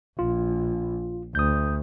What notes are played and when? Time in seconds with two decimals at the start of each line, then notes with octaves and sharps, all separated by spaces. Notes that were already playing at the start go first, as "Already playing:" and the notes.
0.19 A#1 F4
1.35 D2 D#6 G6